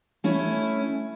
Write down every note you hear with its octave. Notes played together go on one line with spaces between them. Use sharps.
A3 C#4 E4